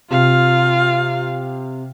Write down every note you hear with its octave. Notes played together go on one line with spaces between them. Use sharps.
C3 F4 F5